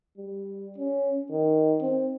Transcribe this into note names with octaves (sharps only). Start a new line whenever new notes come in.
G3
C#4
D#3
C4